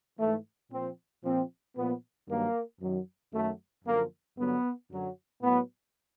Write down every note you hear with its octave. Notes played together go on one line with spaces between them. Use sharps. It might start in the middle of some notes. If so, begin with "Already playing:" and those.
G#2 E3 A3
A#2 F3 C4
A#2 F3 C4
A#2 F3 B3
G2 D#3 F#3 A#3
F#2 D#3 F#3
F#2 D#3 F#3 A3
F#2 D3 F3 A#3
G2 D3 F#3 B3
F#2 D3 F#3
A2 F#3 B3